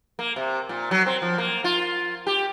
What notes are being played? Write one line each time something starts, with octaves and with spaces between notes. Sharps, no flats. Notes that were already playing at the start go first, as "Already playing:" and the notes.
A#3
C3
A#2
F#3
C4
F3
A#3
F4
G4